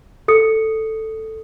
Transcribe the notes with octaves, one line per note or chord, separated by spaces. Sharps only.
A4 D#6 C#7